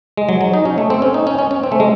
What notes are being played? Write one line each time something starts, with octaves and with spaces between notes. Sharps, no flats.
G#3
F#3
F#3
D#4
C#4
A3
C4
C#4
D#4
C#4
C#4
C#4
C4
A3
G#3